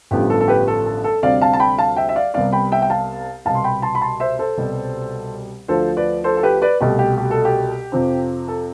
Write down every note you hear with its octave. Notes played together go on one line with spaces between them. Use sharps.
A1 G2 D3 F3 B3 G4
A4
A4
G4 B4
A4
A4
A4
D2 C3 G3 C4 D5 F5
F5 A5
A5
G5 B5
F5 A5
E5 G5
E5
D5 F5
C2 C3 G3 B3 D5 F5
G5 B5
E5 G5
G5
F5 A5
C2 B2 B3 F5 A5
C6
G5 B5
A5 C6
B5
A5 C6
C5 E5
A4 C5
C2 B2 G3 B3
D2 D3 F3 A3 A4 C5
B4 D5
A4 C5
A4
G4 B4
B4 D5
C2 B2 A3 G4
G4
G4
A4
G4
F2 C3 F3 C4
A4